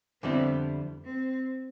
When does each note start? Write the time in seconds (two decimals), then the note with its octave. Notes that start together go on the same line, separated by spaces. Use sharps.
0.23 F2 D3 G3 B3 C4 E4
1.05 C4